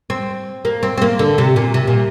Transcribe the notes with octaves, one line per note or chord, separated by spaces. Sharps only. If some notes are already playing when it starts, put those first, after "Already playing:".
C4
A#3
C4
C4
A#3
D3
C3
A#2
C3
A#2